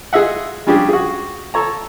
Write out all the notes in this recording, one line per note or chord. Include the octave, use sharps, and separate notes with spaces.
F4 G#4 D#5 E5 F#5
F3 G3 C#4 D4 G4 G#4
F#4 G#4
A4 C#5 A#5